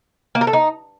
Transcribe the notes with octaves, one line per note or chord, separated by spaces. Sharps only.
A#3
A#4
A4
D#4